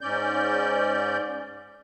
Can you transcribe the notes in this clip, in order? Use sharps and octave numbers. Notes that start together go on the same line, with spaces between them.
G#2 C#4 D5 G6